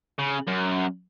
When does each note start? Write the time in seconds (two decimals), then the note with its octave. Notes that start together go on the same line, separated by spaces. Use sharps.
0.19 C#3
0.47 F#2